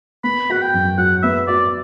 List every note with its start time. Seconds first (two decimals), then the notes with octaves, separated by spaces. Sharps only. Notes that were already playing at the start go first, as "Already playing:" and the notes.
0.24 B3 B5
0.49 F#4 F#5
0.62 G5
0.74 F#2
0.98 F#3 F#5
1.22 B3 E5
1.48 F#4 D5